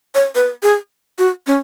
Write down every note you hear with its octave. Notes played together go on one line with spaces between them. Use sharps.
C#5
B4
G#4
F#4
C#4